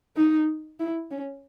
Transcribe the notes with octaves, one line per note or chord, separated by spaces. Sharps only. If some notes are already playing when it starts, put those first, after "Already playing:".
D#4
E4
C#4